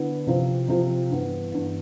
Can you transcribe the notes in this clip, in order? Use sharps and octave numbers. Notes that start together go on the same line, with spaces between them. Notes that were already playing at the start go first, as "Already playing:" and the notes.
Already playing: D3 B3 E4
C3 F3 C4 F4
C3 F3 C4 F4
G2 E3 B3
G2 E3 B3